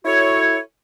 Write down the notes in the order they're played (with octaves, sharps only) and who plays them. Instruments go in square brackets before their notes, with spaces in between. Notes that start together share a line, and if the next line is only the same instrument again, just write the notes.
[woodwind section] E4 F#4 A4 C#5